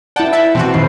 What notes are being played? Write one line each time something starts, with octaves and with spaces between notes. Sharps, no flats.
E4 D5 F#5 G5 A5
E5 A5 B5
B2 E3 C4 F#4 A5
D#1 C7